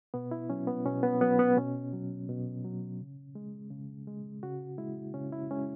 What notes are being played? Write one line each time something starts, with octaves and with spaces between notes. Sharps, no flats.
B2 B3
E4
F#3 C#4
B3
B2 C#4
B3
F#3 B3
B3
B2 C#4
F#3
B2
F#3
C#3
G#3
C#3
G#3
C#3 F#4
G#3 E4
C#3 C#4
E4
G#3 C#4